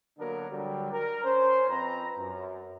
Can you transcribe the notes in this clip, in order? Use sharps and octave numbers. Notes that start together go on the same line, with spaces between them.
D3 F#3 A#3 B3 D4 A#4
D3 F#3 G3
A#4
C#4 C5
F2 C4 B4 A#5
F#2